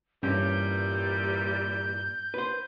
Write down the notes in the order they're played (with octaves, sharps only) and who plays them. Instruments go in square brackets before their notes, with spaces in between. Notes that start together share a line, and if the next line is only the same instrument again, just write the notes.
[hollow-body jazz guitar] G2 [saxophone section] A#2 E3 G3 [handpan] C#4 [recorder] G6
[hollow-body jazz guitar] B4 C5